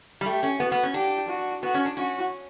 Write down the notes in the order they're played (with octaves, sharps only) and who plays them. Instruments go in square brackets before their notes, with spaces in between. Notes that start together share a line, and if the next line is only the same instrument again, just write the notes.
[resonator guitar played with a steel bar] G3
[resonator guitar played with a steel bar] A3 [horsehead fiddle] G4
[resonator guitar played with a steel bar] C#4
[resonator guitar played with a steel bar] B3 [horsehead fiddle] F#4
[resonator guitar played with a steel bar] B3
C#4
[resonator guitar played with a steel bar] D4 [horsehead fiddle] G4
[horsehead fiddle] F#4
[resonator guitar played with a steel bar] B3 [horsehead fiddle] F#4
[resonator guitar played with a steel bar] C#4
D4
[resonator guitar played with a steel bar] C#4 [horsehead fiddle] F#4